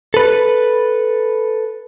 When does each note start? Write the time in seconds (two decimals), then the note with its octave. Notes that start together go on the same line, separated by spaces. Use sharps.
0.14 A4 B4